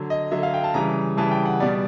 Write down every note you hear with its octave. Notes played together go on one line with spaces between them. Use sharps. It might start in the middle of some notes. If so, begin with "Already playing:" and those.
Already playing: D3 F#3
D#5
D3 F#3 E5
F5
G5
A5
C#3 E3 G3 A#5
C#3 E3 G3 A5
G5
F#5
B2 G3 D5